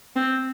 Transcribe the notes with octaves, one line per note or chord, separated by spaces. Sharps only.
C4